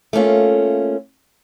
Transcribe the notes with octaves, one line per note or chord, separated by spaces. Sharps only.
A3 A#3 C#4 F4